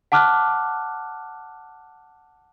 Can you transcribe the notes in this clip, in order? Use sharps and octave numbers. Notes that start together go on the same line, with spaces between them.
F#5 A5 D6 F6 F#6